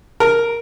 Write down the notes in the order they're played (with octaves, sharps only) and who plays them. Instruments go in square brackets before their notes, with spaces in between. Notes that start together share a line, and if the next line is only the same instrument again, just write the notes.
[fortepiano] A#4